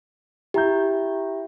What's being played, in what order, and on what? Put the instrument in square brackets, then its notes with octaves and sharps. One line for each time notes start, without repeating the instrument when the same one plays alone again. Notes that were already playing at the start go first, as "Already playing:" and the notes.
[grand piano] E4 A#5 G6 [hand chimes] G4